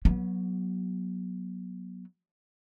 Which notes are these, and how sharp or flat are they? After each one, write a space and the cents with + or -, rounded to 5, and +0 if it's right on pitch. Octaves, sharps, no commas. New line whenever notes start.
F#3 +0 B3 -30